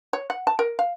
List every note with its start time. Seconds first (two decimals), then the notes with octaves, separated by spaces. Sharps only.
0.13 C#5
0.30 F#5
0.47 A5
0.59 A#4
0.79 F5